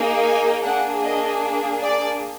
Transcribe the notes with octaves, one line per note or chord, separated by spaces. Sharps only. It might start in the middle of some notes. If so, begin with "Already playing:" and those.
Already playing: A#3 D#4 G#4
G#5
A#3 D4 G#4 F#5
D#5
D5